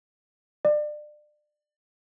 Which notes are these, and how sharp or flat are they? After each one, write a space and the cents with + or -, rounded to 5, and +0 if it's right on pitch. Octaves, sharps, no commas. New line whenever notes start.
D5 +30